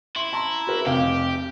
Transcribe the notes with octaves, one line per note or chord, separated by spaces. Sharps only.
E4 C6
A5 A#5 C6
F#4 A#4 B4
F1 G4 F5